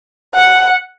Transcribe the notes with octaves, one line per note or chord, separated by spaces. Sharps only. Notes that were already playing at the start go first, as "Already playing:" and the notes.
F#5